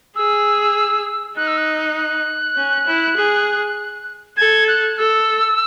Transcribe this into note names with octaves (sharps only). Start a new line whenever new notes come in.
G#4 E6
D#4 F#6
E6
F#6
F#6
C#4
E4
G#4
A4 G#6
F#6
A4 E6